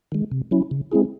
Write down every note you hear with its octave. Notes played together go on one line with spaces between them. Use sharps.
D#3 G#3
C3
F#3 C#4 E4
C#3
G#3 C4 E4 G#4